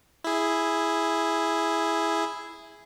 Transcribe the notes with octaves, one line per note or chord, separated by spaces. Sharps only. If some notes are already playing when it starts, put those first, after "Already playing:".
E4 G#4